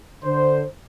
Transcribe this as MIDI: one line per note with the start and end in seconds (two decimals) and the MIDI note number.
0.24 0.63 50
0.24 0.63 72